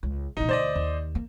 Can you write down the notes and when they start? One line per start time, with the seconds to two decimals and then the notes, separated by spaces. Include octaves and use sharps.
0.03 C#2
0.37 A1 B2 D#4
0.49 D2 C5 D5 D#5
0.75 D#2
1.15 A#3